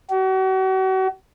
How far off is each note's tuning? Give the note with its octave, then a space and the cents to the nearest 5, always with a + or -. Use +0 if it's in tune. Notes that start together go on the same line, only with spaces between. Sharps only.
F#4 +40